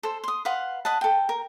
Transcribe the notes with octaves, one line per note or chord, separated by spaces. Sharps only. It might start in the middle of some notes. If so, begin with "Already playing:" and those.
A4 C5
C6 D#6
B4 F5 F#5 C6
B4 D#5 F#5 A5
A4 G5
A#4